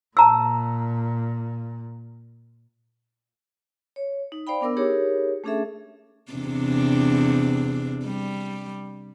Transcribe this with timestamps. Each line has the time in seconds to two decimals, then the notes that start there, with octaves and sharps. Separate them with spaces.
0.17 A#2 A5 A#5 E6
3.96 C#5
4.32 D#4
4.47 C5 D5 F5 G5 B5
4.61 B3 D4 A#4 D6 E6
4.77 D#4 G4 G#4 A#4 C#5
5.44 A3 C#4 D4 G#4 A4 E5
6.32 E2 C3 D4
8.05 G3